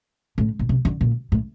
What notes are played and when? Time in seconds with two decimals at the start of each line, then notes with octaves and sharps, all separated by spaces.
0.38 A2
0.59 A#2
0.69 C3
0.85 D3
1.01 A#2
1.32 A2